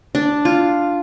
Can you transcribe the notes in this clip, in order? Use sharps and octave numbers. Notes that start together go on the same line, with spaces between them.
D4
F4